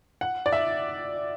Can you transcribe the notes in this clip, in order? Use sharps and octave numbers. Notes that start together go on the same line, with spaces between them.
F#5
D5
E5